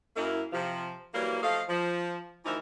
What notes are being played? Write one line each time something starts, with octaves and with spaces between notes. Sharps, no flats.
F#2 A#3 E4
C3 F3
E3 F#3 G3 A#3
F3 A3 D#5 F5
F3
D2 E3 F3 D#4 A#4 E5